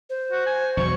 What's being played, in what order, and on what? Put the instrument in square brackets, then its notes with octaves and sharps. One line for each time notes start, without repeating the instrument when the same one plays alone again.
[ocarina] C5
[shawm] F#4
G#5
[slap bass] E2 B2 F#3 [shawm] C#6